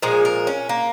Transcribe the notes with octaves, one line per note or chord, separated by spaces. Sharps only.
A#2 F3 G#3 G#4
A#4
C#4
A#3